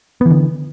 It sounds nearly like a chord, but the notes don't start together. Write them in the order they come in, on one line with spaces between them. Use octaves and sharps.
B3 E3 D3